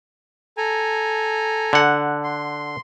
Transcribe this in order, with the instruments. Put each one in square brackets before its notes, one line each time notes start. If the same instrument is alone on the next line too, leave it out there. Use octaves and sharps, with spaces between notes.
[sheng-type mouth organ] A4 G#5 A#5
[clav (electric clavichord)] D3 F#5
[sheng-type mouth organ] C6